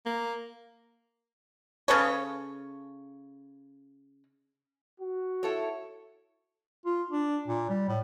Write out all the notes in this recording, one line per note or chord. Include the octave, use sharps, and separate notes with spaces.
A#3
C#3 A4 B4 C#5
F#4
E4 A4 C#5
F4
D4
A#2
G3
A2